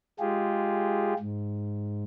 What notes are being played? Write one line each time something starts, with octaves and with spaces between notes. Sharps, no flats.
G#3 F4 G4 G#4
G#2